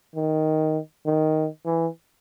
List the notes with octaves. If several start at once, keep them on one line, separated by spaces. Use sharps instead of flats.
D#3
D#3
E3